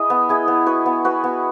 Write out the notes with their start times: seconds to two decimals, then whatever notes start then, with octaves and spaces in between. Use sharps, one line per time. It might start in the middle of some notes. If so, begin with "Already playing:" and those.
Already playing: E4 G#4 D#5
0.10 B3
0.29 E4 G#4 D#5
0.48 B3
0.66 F#4 B4
0.86 B3
1.05 F#4 B4
1.24 B3